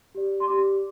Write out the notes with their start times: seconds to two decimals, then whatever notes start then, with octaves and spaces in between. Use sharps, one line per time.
0.15 G4 D5
0.40 C6
0.47 G4 D5 D6